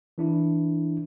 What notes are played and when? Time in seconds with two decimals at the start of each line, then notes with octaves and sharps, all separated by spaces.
0.18 E3 D4 E4